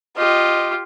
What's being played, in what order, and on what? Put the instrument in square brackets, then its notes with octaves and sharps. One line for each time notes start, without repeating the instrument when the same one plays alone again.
[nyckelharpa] F4 G4 [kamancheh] D#5